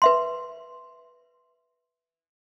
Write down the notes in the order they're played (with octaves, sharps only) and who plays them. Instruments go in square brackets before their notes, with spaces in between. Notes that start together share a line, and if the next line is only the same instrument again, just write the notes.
[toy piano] B4 E5 C6